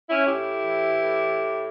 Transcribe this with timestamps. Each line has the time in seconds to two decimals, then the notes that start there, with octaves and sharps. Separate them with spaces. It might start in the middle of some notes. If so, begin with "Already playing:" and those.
0.10 C#4 E4
0.27 A2 E4 G4
0.60 E3
0.94 A2